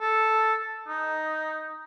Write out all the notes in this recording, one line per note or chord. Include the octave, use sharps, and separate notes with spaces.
A4
D#4